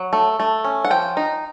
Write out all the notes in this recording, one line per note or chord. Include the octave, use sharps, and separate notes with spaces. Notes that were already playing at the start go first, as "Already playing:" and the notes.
Already playing: F#3
A3
A3
C#4
F#5
F3 G5
D#4